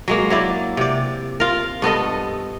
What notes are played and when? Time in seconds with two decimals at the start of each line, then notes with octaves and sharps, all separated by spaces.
0.08 F#3 G#3 A#3
0.30 F#3 E4 D5
0.77 C3 D5
1.40 F4 A#4
1.82 G2 B3 A4 D#5